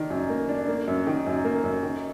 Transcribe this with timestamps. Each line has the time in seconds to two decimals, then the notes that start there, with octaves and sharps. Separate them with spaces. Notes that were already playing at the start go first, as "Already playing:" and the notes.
Already playing: D#3 A#3 D4
0.10 F#2
0.30 A#3
0.49 D4
0.68 A#3
0.88 F#2
1.07 D#3
1.26 F#2
1.45 A#3
1.64 F#2
1.83 D#3